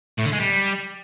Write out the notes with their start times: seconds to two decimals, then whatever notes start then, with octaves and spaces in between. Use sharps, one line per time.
0.19 A2
0.26 D3
0.33 G#3
0.40 G3